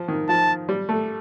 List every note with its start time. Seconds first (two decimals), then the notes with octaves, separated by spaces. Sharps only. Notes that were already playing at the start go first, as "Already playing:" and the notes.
Already playing: F3
0.08 D#3
0.29 F3 A5
0.69 G3
0.89 A3